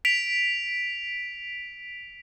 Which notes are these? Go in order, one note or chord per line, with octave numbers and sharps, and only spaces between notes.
B6 D7 F7